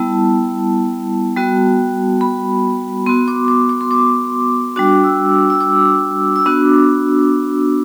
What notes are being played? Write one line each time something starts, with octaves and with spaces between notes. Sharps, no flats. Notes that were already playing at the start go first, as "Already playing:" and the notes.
Already playing: G3 B3 E4 A5
G3 B3 F#4
B5
B3 F#4 C6
D6
D6
D6
C6
D6
G3 D4 F#4 D6
E6
E6
D6
E6
B3 D4 F#4 D6